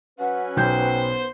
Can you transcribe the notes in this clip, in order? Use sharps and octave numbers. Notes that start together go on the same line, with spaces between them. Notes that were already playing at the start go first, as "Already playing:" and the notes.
F#3 C#4 B4 F#5
B1 B3 C5 G5 G6